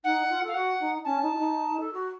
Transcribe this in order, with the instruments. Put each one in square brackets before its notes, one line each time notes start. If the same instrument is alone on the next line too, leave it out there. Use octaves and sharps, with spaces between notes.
[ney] D#4 [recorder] F#5
[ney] F4
A4
[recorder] F5
[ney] F#4 [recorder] F#5
[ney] D#4
[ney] C#4 [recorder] A5
[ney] D#4
F4
D#4
A4
F#4